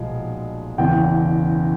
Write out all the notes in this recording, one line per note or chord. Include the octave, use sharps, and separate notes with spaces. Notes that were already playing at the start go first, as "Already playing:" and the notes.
Already playing: B1 A#2 F3 G#3
F#1 E2 C#3 G5